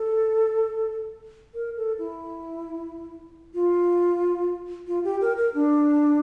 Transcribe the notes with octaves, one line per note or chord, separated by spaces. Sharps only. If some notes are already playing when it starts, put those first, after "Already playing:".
Already playing: A4
A#4
A4
E4
F4
F4
G4
A#4
A#4
D4